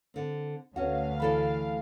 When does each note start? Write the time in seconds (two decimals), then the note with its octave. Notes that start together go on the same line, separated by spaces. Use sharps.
0.14 D3 C4
0.76 D2 C#4 F#4 B4 F5 F#5
1.20 E3 A4 D5 B5